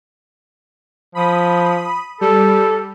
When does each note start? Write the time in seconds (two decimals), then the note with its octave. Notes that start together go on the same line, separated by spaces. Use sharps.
1.15 F3 B5 D#6
2.21 G3 A4